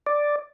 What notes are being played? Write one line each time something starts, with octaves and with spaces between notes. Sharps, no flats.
D5